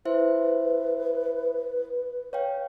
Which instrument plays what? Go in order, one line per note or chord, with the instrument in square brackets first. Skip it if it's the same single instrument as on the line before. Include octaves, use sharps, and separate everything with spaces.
[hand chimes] E4 C5 E5 [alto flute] B4
[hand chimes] C#5 F5 G5